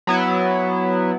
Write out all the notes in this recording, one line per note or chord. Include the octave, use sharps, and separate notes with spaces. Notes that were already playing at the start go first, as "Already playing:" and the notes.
F#3 B3 E4